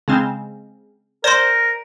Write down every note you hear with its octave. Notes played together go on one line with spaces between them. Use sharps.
C#3 G#3 C4
A#4 C5 D5 C6